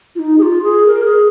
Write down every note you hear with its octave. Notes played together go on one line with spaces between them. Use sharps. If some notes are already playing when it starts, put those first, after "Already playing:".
F4
D#4
G#4
F4
G#4
A#4
G#4